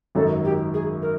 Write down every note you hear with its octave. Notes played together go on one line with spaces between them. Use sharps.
G#1 F#2 D#3 F#3 A4
G4
G#4
A#4